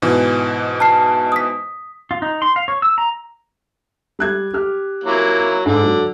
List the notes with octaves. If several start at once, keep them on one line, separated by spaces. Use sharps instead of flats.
G#2 B2 E3
A5 F6 C7
D#6 B6
F4
D#4
C6
F5
C#5
E6
A#5
G3 F#6 G#6
G4 F6
F#3 A#3 E4
G#2 D3
F#3